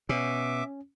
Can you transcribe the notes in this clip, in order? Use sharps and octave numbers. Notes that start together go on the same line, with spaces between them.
B2 C#4 E5 D6